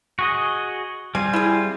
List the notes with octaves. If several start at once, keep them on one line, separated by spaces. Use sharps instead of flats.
F#4 G#4 D#5
G3 C4 F4 G#5
E4 G#4